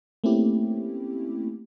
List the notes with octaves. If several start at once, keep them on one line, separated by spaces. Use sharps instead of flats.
A3 A#3 C4 C#4 E4 G4